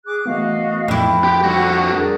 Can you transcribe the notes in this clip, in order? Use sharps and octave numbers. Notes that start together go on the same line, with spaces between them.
G#4 D6 F#6
E3 A3 B3 F#4 D#5 F5
F2 E4 D6
G4 B4 G5 C6
D3 G3 F#4 F#5 C#6 D6
G#4 A#4 D5